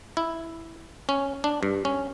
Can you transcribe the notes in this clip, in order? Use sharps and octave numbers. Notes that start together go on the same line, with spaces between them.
E4
C#4
D4
G2
C#4